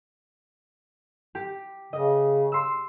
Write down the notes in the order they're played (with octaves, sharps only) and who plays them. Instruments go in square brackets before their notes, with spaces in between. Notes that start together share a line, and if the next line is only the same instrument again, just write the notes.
[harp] G4
[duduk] C#3 [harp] D#5
[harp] C6 E6